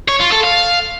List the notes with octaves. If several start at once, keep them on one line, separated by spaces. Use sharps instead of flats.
C#5
F4
A4
F5